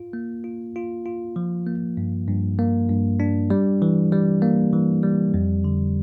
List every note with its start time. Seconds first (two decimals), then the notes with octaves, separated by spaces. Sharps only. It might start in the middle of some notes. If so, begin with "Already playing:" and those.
Already playing: F4
0.13 A#3
0.44 F4
0.76 F4
1.06 F4
1.36 F3
1.67 A#3
1.97 G2
2.28 G2
2.59 A#3
2.89 G2
3.20 D4
3.50 G3
3.82 E3
4.12 G3
4.42 A#3
4.73 E3
5.03 G3
5.34 F2
5.64 D3